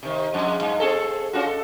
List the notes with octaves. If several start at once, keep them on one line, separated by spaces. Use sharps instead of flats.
C3 D#3
F2 G#3
G2
C4 G#4 A4
C#4 F4 F#4
A4